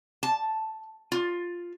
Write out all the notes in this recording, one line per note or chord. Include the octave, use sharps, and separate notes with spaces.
A5
F4